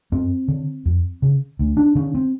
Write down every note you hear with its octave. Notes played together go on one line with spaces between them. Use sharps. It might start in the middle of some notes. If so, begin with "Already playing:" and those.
F#2 C4
D3
F2
C#3
D2
D4
D3 C#4
C4